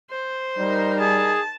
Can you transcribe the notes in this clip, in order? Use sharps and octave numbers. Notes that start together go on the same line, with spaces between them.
C5
G3 D#4 A#4
G#4 A5